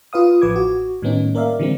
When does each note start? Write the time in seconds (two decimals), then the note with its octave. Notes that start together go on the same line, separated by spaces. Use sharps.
0.13 F4 B4 F5 D#6
0.42 A1 F3 B4 D6 G#6
0.56 F#4
1.02 A2 D#3 G3 B3 C#4 D#4
1.35 A#3 A#4 D5 E5 F5
1.59 D3 E3 G3 G#3 C4